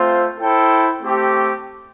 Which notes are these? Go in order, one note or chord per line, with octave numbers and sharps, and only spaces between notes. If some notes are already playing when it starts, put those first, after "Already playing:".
Already playing: A3 C4 F4 C5
E4 A4 C5 G5
A3 C4 G4